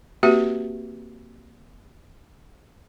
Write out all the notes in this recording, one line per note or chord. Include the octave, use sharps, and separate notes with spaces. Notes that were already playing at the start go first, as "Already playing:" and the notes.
A#3 C4 F#4 G4 B4 E5